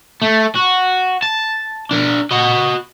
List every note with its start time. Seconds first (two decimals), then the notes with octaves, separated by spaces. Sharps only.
0.22 A3
0.55 F#4
1.22 A5
1.91 D4 A#4
2.31 F#4 D#5